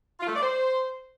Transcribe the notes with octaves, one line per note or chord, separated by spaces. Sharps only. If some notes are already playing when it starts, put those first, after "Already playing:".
F4
A3
D5
C5